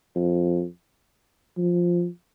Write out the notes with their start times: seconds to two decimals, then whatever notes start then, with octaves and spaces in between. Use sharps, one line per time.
0.15 F2
1.57 F3